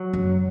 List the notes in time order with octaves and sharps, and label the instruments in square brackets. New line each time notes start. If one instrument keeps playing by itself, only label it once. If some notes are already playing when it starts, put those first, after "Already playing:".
Already playing: [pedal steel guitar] F#3
[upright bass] F#2